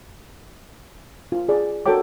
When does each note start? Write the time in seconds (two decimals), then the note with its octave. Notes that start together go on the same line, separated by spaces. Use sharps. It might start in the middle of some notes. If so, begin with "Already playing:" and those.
1.32 F4
1.49 G#4 D5
1.86 F#4 A4 A#4 C#5 G5 D6